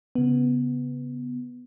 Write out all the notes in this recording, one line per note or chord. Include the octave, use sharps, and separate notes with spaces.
C#3 B3